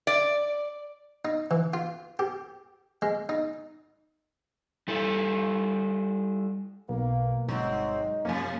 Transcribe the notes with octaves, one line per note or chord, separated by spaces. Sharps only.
D5
D#4
E3
F4
G4
G#3
D#4
G3 E4 A4
B1 B2 A#3
G1 F#3 G#3 C4 D#4
F#2 C3 F3 A#3 C#4